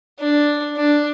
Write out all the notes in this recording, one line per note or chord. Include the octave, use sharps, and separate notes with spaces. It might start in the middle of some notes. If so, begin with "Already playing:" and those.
D4
D4